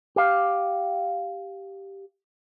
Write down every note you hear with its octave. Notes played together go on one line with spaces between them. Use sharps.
G4 F5